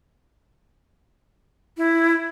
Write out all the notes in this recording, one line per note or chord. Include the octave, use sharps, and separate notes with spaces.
E4